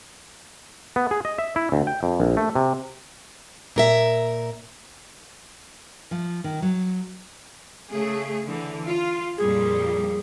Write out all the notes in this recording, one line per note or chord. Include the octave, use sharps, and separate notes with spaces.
B3
G#4
D#5
E5
E4
D2
G5
F2
A#1
A3
C3
A#2 A#4 E5
F3
D#3
F#3
C#3 A3 G#4
D3 E3
F4
F2 A#2 G3 G#4